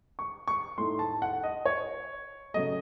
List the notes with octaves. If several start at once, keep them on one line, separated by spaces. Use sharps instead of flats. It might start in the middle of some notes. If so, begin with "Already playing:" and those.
C#6
C#6
A2 A3 D#4 C6
A5
F#5
D#5
C#5
C#3 F#3 A3 D#5